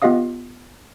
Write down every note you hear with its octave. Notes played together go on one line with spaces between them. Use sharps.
B3 F4 G4 D#5 F5 D#6